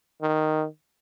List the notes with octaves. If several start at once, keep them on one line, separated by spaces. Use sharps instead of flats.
D#3